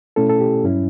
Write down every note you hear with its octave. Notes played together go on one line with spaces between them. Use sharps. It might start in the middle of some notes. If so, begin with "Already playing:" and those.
B2 A3 C#4 E4 A4
A4
G4
G2 F#3 C#4 E4